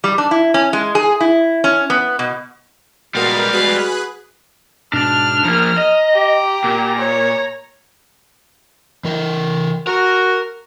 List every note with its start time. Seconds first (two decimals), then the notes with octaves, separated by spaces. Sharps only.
0.04 G3
0.18 D4
0.31 E4
0.54 C#4
0.73 G#3
0.95 G#4
1.21 E4
1.64 C#4
1.90 B3
2.19 B2
3.15 A#2 G3 G#3 B3 F#4 A#4 F5
3.52 F#4 G#4 B4 F#6
4.93 G#2 B2 D4 F6
5.44 F3 A#3 A#5
5.78 D#5
6.14 G4
6.64 A#2
6.98 C#5
9.04 E3 A#4
9.87 F#4 A#4 A#5